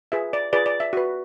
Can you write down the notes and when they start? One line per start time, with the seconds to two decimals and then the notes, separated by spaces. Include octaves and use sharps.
0.12 F4 G#4 B4 E5
0.33 D5
0.53 F4 G#4 B4 D5
0.66 D5
0.80 E5
0.93 F#4 B4